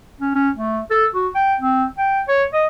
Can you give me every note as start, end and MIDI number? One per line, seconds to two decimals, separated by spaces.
0.21 0.33 61
0.35 0.50 61
0.57 0.79 57
0.91 1.06 69
1.15 1.28 66
1.35 1.54 79
1.60 1.84 60
1.98 2.20 79
2.28 2.44 73
2.53 2.67 75